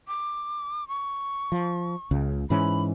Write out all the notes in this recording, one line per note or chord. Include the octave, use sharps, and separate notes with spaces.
D6
C#6
F3
C#2 C#3
G#2 E3 C#4 B5